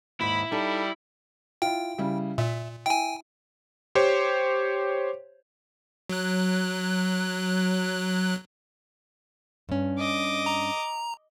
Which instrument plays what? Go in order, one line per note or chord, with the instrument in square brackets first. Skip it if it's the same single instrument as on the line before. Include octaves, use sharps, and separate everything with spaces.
[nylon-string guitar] D#2 G#2 [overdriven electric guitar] E4 [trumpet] B5
[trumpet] G3 [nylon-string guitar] D#4 A4
[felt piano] E4 F4 [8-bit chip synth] G5
[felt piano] C#3 G3 E4
[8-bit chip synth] A#2 [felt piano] E5
[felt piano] E4 [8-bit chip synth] G5 G#5
[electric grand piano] G4 C5 C#5
[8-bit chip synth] F#3 F#6
[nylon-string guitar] G2 C#4
[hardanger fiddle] D#5 D6
[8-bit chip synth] A#5